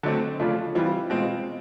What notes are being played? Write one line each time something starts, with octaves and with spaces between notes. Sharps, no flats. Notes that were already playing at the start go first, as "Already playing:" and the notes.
D3 F#3 A3 C4
C#3 F3 A3 D4 F4
E3 G3 C4 F4
B2 G#3 C4 F4